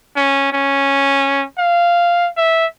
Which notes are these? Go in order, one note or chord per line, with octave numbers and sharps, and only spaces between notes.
C#4
C#4
F5
E5